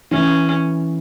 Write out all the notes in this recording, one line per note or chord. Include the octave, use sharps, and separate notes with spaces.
E3 C#4